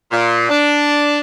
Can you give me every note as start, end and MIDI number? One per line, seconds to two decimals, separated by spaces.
0.12 0.47 46
0.49 1.19 62